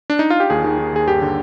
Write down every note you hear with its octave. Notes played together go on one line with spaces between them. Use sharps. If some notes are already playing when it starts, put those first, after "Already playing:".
D4
D#4
F4
G4
D#2 G#4
D#3
D#3
D#2 G#4
G2 G4
D3